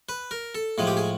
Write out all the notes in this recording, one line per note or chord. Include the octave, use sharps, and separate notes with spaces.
B4
A#4
A4
A2 F3 G#3 G#4
G4
G#4